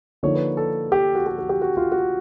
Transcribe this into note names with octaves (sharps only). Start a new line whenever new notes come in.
D3 F3 A#3 D#4 C#5
B4
A4
G4
F#4
G4
F#4
G4
F#4
F4
F#4